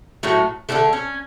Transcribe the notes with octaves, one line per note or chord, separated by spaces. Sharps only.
A2 F#3 A3
D3 F#3 A3 D4
C#4